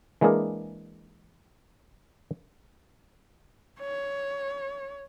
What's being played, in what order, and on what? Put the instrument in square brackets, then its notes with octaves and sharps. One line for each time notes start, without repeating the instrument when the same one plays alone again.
[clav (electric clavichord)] E3 G#3 A#3 D4 G#4 A#4
[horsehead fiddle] C#5